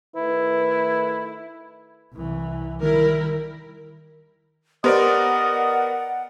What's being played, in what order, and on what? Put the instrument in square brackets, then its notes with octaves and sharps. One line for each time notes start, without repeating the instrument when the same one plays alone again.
[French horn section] D#3 A3 B4 [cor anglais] E4
[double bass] C2 E3
[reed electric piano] D#3 [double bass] G3 [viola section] E4 A#4
[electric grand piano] B3 A#4 D5 [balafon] G4 C5 C6 [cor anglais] D#5 [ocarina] F#5